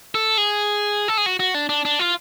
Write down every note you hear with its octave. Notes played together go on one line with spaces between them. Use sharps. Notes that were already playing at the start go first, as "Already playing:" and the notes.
A4
G#4
A4
G#4
F#4
F#4
D4
D4
D4
F4